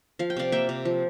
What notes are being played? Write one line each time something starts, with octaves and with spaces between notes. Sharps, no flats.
F3 F5
G5
C3 D5 F5
A#3 E5 G5
C3
F3